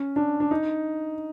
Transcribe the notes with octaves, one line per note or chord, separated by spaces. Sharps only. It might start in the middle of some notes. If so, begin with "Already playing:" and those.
Already playing: C#4
D4
D4
D#4